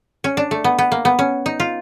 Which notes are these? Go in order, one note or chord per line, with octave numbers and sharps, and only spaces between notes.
C#4
D4
A3
B3
B3
A#3
B3
C#4
D#4
F4